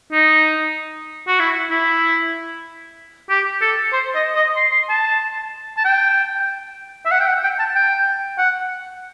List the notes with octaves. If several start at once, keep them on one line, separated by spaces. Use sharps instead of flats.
D#4
F#4
E4
E4
G4
A4
C5
D#5
D#5
C6
C6
A5
A5
G5
E5
F#5
G5
F#5
G5
A5
G5
F#5